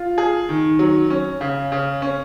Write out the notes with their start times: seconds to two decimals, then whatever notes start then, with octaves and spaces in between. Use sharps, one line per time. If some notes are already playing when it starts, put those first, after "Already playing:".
Already playing: F4
0.18 G#4
0.49 D#3
0.79 F#3
1.10 C#4
1.41 C#3
1.72 C#3
2.02 C#4